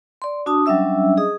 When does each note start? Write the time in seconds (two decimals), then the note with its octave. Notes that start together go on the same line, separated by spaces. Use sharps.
0.22 D5 C6
0.46 D4 F#4 A5 D#6
0.66 F#3 G3 C#4 D4 E5 E6
1.17 G#4 D#5 D#6